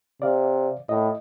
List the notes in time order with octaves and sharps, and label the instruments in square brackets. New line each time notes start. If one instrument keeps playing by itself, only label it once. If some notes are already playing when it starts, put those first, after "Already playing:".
[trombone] C3 [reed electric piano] D5 F5
[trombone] A2 [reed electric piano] D#5